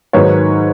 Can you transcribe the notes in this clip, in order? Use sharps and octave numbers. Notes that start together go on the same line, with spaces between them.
G#2 D#3 F#3 B4 C#5